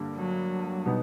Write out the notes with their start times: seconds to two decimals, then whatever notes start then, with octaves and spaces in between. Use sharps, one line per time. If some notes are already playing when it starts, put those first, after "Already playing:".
Already playing: G2 D3 G3 A#3 D4
0.16 F#3
0.85 B2 G3 B3 D#4